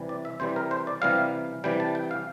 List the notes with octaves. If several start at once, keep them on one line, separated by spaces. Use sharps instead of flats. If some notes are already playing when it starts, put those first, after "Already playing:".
Already playing: C3 E3 G3
D5
E5
C3 E3 G3 C5
A#4
C5
D5
C3 E3 G3 F5
C3 E3 G3 G5
A5
G5
F5